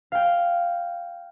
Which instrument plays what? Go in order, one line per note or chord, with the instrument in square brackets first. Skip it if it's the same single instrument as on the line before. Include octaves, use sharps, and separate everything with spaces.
[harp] F5 G5